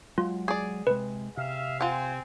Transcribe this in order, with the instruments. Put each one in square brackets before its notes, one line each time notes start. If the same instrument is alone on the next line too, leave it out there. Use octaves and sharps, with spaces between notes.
[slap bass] F#3 G#3 [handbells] F4
[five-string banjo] G#4 D5
[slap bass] C3 G#3 [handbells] B4
[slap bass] C3 [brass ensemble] E5 F5
[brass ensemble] C4 G#5 [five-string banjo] F4 F#5